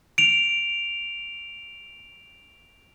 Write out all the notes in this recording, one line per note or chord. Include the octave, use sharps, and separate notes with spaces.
D7 F7